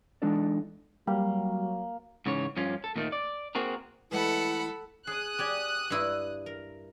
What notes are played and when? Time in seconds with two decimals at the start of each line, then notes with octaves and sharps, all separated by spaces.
0.22 E3 G#3 D4 D#4 A4 D5
1.07 F#3 G3 A#3
2.26 G#2 C#3 E3 C#5
2.57 G2 F3 C#4 F4
2.84 A4
2.96 D#2 A#2 D#3 A3
3.12 D5
3.55 A#3 C4 F#4 G#4 A#4
4.11 E3 G#3 A3 E4 A4 F#5 B5
5.07 G#4 D#6 F#6
5.39 G4 D5 G#5
5.90 G2 E4
6.46 A#4